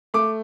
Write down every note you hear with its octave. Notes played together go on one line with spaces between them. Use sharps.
A3 D6